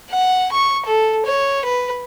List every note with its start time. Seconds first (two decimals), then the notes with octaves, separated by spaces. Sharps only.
0.11 F#5
0.52 C#6
0.86 A4
1.26 C#5
1.65 B4